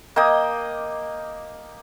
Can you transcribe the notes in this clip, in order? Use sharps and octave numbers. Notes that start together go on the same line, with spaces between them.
A#3 D#5 G5 D#6